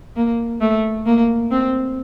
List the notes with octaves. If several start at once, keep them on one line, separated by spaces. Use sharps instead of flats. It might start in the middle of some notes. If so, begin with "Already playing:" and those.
A#3
A3
A#3
C4